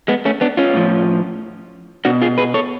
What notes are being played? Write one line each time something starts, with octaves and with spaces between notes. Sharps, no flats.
G#3 B3
A3 C#4
B3 D4
C#4 F4
A2 F3
B2 D4 F#4
F4 G#4
G#4 B4
A4 C#5